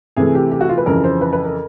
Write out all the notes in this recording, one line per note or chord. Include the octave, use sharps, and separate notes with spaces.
C3 E3 A3 G#4
G4
G4
F#4
F4
B4
F2 C#3 E3 A#4
C5
B4
B4
A#4